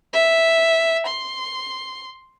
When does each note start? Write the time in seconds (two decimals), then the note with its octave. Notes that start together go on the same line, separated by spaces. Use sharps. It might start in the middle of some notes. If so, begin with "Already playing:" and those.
0.13 E5
1.07 C6